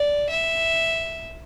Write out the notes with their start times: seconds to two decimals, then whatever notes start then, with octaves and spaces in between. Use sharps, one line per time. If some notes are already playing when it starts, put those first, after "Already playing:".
Already playing: D5
0.30 E5